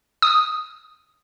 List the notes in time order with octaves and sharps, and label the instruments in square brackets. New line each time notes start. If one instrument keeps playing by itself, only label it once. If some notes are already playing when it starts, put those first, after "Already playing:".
[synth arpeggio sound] D#6